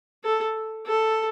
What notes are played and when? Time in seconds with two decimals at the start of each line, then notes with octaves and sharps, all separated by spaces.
0.24 A4
0.86 A4